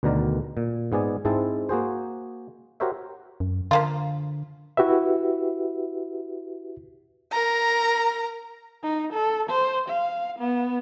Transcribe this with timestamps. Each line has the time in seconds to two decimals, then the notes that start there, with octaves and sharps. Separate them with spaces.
0.03 D2 B2 D3 D#3 A#4 D5
0.57 A#2
0.92 G#2 B3 G#4 D5 G#5
1.25 G#2 G#3 C4 E4 A5
1.69 A#3 F#4 G#4 C5
2.80 F#4 G4 A#4 C5 C#5 E5
3.40 F#2
3.71 D3 F3 A#3 F4
4.77 E4 F#4 G4 B4 E5
7.32 A#4 A#5
8.83 D#4
9.13 A4
9.50 C5
9.89 F5
10.39 B3